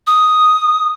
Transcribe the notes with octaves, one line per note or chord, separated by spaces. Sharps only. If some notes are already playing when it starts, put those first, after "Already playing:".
D#6